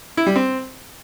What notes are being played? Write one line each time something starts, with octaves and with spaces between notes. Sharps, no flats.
E4
G3
C4